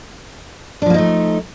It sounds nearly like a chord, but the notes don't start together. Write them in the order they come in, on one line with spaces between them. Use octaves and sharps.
D4 F3 A#3 D#4 A3